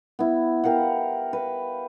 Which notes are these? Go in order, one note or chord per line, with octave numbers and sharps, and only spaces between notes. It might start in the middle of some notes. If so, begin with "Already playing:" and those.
B3 E4
G4 A#4 F5 F#5
B4